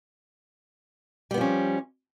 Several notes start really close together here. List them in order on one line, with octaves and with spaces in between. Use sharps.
G3 B3 F3 C#4